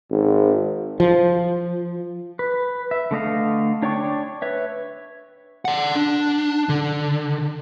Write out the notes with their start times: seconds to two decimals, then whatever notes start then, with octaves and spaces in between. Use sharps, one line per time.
0.11 G#1
1.00 F3
2.39 B4
2.91 E5
3.11 D3 A3 D#5 F5
3.82 D4 C#5 D5 G5 C#6
4.42 B4 C#5 E5
5.65 D5 F#5
5.96 D4
6.69 D3